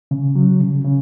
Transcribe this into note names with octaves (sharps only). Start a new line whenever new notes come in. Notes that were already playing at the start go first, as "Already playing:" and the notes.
C#3
F#3
C#3
C#3